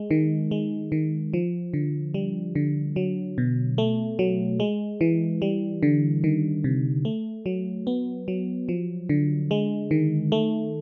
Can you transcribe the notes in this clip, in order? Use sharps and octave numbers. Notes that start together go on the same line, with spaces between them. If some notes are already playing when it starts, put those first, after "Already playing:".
Already playing: G#3
D#3
G#3
D#3
F3
D3
G3
D3
F#3
B2
A3
F#3
G#3
E3
G3
D3
D#3
C3
A3
F#3
B3
F#3
F3
D3
G#3
D#3
A3